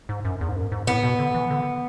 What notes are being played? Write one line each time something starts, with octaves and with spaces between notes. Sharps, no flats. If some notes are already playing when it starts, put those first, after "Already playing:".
G#2
F#2
E2
G#2
F#2
G#2
A2 B3
B2
D3
E3
D3